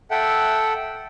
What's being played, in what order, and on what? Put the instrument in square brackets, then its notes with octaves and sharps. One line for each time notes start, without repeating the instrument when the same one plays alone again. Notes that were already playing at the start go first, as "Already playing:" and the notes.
[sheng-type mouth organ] A4 E5 F#5 G5